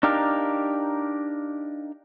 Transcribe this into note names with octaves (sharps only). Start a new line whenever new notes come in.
D4 D#4 G4 A#4 F5